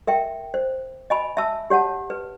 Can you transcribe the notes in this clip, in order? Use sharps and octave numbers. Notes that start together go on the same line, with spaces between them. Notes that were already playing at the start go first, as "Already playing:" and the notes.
A#4 E5 G5
C5
D#5 G#5 B5
E5 A5 E6
G4 C#5 F#5 A5
B4